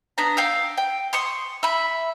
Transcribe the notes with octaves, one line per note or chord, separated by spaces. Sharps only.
B3 D4 A#5
F5 G5 E6
G5
C6 C#6 D#6
E5 B5